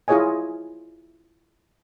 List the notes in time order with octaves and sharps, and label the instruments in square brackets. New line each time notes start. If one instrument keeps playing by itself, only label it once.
[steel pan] E4 F4 G#4 C#5 D#5 G#5